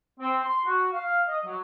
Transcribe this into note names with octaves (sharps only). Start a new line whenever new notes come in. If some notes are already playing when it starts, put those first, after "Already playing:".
C4
C6
F#4
F5
D#5
F#3